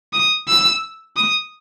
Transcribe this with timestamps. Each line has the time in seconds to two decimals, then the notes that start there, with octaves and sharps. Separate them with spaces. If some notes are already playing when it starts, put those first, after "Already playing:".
0.13 D#6
0.48 E6
1.17 D#6